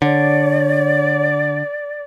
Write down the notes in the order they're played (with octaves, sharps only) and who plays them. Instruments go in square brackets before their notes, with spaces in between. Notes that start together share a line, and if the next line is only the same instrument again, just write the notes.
[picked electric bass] D3 [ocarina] C#5 [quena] D5